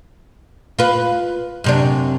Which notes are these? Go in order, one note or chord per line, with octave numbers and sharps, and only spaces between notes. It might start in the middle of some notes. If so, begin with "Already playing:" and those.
F4 B4
F#2 C3 D4